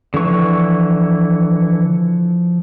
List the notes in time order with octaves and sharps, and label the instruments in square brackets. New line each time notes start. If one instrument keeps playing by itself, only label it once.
[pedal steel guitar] D3 E3 C#6 [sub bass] F3